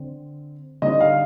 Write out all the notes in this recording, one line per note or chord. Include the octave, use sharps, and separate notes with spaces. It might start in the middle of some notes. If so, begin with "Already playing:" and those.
Already playing: D3 C4
D3 G3 C4 D#4 D#5
F5